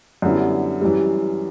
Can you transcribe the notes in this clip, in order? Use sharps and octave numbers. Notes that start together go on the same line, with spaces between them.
F#2 D3 G3 B3 E4
F#2 E3 G3